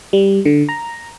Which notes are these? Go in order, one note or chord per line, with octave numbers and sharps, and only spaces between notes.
G3
D3
A#5